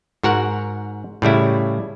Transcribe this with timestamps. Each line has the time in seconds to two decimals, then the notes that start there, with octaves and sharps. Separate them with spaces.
0.23 G#2 F#4 A#4 F#5
1.22 A2 C#3 G3 E4